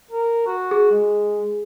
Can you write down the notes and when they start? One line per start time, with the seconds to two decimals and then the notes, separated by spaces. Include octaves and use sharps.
0.11 A#4
0.46 F#4
0.71 G#4
0.92 G#3